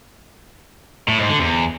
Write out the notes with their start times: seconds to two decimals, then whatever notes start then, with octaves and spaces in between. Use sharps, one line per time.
1.08 A2
1.19 G#2
1.29 D3
1.40 E2